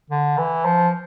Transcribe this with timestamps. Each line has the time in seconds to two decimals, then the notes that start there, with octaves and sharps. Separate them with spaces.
0.10 D3
0.38 E3
0.65 F3